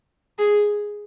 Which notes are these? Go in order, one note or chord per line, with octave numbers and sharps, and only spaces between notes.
G#4